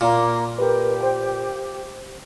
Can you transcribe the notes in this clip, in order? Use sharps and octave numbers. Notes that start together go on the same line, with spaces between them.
A#2 A#3
G4 A#4 B4
C5 G5